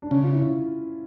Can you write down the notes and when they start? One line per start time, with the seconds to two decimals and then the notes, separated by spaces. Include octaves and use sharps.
0.02 D4
0.10 C#3 C#4
0.23 F4
0.32 E4